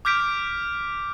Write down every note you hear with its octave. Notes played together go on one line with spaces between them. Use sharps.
D6 F6 G6 B6 D7